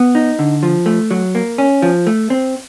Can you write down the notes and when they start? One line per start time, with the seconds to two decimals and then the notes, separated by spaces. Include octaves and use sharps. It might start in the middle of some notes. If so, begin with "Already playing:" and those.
Already playing: B3
0.15 D#4
0.39 D3
0.63 F3
0.86 A3
1.11 F#3
1.35 A#3
1.58 C#4
1.82 F3
2.07 A3
2.30 C4